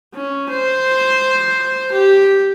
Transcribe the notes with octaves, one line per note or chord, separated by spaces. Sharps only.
C#4
C5
G4